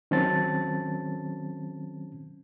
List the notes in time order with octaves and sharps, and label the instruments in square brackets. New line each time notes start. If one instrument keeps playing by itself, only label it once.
[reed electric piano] D#3 F#3 C4 C#4 A5 A6